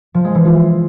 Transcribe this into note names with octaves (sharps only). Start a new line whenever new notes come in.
F3
G#3
E3
F4